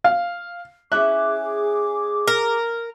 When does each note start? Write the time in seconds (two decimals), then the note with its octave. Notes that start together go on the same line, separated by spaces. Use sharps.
0.04 F5
0.92 C#4 E4 G#4 E5 D6 F#6
2.27 A#4